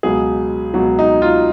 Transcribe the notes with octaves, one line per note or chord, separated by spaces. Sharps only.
C#2 B2 F#3 G#4
C#2 B2 F#3
D#4
F4